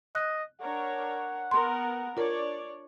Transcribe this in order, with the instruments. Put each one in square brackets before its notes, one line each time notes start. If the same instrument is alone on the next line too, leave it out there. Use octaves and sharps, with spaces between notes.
[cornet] D#5 [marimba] F#6
[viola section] D4 A#4 C#5 [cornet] F#5
[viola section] B3 A#4 [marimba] C6
[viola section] D4 C#5 D5 [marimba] F4 A#4